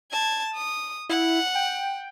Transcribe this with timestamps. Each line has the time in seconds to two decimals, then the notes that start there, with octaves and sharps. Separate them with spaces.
0.11 A5 G#6
0.54 D#6
1.09 E4 F#5
1.55 G5